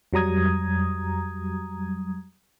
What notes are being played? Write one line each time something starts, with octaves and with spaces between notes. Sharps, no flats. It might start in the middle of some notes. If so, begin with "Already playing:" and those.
F2 F#3 G3 A#5 D#6 G#6